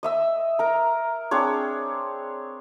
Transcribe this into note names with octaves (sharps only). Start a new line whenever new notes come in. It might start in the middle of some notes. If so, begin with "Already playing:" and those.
D#5 E5 E6
A#4 A#5
C4 D4 G#4 C#5